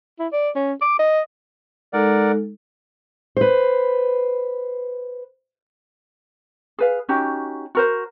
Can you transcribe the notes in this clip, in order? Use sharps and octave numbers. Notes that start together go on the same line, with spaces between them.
E4
D5
C#4
D6
D#5
G#3 D#4 A4 A#4 D5 F#5
B4 C5
G#4 B4 F5
C#4 D#4 F#4 G4
F#4 A#4 C5